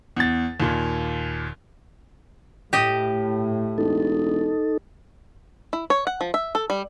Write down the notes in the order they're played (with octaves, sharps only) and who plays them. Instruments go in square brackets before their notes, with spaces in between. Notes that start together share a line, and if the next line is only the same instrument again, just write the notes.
[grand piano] E2 A6
D#2 A#2
[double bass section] A2 [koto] G4 D#5
[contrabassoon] E1 [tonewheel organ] D#4 A4
[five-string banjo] E4
C#5
F#5
F3
E5
A4
G3